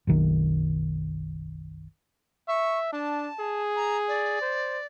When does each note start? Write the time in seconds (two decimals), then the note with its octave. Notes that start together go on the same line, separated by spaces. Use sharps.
0.07 F#1 B1 D#3
2.48 E5 C#6
2.93 D4 A5
3.40 G#4
3.76 A#5
4.08 D5
4.41 C5